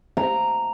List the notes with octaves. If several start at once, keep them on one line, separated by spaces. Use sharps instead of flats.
A#5